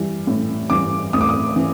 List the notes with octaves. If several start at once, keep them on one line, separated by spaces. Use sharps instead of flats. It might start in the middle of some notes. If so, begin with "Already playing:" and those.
Already playing: E3 G3
A2
E3 G3 D6
A2 D#6
D6
D#6
E3